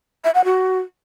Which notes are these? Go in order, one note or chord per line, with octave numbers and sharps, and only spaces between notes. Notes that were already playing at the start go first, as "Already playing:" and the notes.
E5
F#5
F#4